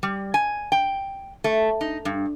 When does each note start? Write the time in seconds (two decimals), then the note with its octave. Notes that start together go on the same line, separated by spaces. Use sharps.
0.03 G3
0.34 G#5
0.72 G5
1.44 A3
1.81 D#4
2.05 G2